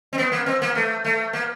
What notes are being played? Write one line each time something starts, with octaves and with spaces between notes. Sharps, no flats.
C4
B3
A#3
C4
A#3
A3
A3
A#3